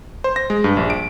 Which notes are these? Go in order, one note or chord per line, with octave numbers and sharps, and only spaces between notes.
C5
A#6
G#3
G2
A#1
D7